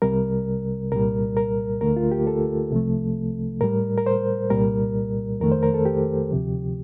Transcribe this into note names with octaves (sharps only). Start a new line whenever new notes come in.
C2 C3 G3 A#4
C2 A#2 G3 A#4
A#4
D2 D3 A3 A#4
F4
G4
A4
C2 C3 F3 A3
A2 G3 A#4
A#4
C5
C2 A#2 G3 A#4
F2 D#3 A3 A#4
C5
A#4
A4
G4
D2 C3 F3